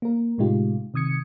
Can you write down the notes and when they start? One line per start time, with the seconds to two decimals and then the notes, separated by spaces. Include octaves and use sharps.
0.02 A#3 A#4
0.38 A2 C3 G#3 D#4 F4 G4
0.94 C3 D#3 D#6 G#6 C#7